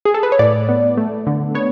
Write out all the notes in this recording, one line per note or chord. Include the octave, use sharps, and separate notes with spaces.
G#4
A4
B4
C#5
A2 D5
B3
A3
D3
B3 C#5